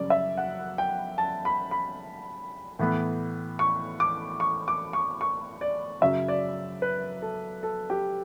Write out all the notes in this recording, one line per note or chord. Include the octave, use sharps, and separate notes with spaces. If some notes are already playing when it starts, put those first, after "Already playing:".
Already playing: F#2 C#3 G3 C#4 D5
E5
F#5
G5
A5
B5
B5
A2 E3 B3
C#6
D6
C#6
D6
C#6
C#6
D5
F#2 C#3 F#3 E5
D5
B4
A4
A4
G4